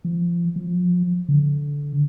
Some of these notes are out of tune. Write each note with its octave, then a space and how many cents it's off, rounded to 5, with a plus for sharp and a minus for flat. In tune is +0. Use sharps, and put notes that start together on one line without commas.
F3 -20
F3 +30
D3 -20